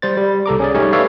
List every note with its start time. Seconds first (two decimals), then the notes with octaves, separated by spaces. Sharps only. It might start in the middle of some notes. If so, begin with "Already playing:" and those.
0.02 G3 C5 A6
0.17 G3
0.46 C2 A4 A#5 D6
0.60 C#4 G#4 D5
0.75 G3 A3 C#4 D#4 G4 C#5
0.93 A4 B4 C#5 D5 E5 F5